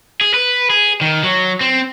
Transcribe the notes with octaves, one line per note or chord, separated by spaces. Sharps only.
G#4
B4
G#4
D#3
F#3
C4